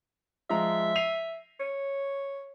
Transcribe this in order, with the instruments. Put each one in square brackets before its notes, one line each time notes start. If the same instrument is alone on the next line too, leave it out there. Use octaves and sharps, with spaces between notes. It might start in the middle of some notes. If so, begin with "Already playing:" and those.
[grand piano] F3 G#3 A#5 [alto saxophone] E5
[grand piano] C7 D#7 F7
[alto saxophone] C#5